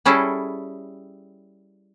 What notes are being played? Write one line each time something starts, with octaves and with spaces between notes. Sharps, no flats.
G3 C#4 E4 G#4 A4